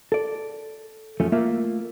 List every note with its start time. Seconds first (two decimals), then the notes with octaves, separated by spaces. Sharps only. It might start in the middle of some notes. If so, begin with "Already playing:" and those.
0.12 A4 D5
1.20 F#2 F3 A3 C#4
1.32 A3 A#3 F4 E5